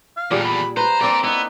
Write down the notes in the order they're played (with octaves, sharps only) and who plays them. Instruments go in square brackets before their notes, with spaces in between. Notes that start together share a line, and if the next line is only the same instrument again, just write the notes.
[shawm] F5
[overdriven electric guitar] E2 D3 [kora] A#2 G3 G#4
[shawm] B5
[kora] B4 [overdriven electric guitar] C5 [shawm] A#5
[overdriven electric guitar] G3 D5 [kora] A#3 C4 D4
[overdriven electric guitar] B3 [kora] D#4 [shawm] E4